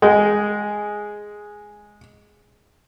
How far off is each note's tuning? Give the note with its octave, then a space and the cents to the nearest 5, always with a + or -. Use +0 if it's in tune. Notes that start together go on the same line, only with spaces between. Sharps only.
G#3 +0 G5 -35